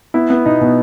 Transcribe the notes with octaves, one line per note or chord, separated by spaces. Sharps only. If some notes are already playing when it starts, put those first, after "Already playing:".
B3 E4
B3
B2 D#4
B2